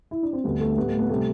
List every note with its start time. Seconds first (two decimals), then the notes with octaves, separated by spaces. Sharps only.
0.11 E4
0.23 D4
0.33 C4
0.44 D2 D3 G3 B3
0.60 A3
0.77 A2 G3 B3
0.88 A3
0.99 B3
1.09 C3 G3 A3